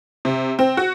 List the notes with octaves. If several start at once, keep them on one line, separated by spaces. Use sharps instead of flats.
C3
C4
F#4